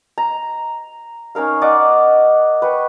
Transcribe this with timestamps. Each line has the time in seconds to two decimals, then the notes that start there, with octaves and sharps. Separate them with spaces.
0.18 A#5
1.35 C#4 D#4 A#4 F5
1.62 D5 D#5 F#5 D6
2.62 B4 G5 C#6